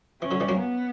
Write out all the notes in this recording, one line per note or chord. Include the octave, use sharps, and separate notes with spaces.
E3 C#4
D3 F#3
E3 G3
F#3 A#3
B3